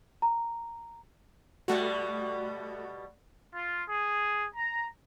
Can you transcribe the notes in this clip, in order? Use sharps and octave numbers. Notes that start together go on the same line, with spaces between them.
A#5
B2 G3 A3 F#4
F4
G#4
A#5